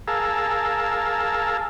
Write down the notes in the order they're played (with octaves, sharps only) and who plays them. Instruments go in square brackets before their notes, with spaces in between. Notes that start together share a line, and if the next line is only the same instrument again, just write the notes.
[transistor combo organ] G#4 A#4 F5 A5 E6